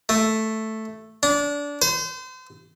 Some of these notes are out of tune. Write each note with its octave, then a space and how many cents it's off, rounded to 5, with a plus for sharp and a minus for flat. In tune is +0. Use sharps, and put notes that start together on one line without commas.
A3 +0
D4 -25
C5 -35